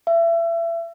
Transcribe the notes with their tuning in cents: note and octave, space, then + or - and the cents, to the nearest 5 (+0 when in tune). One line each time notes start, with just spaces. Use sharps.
E5 +30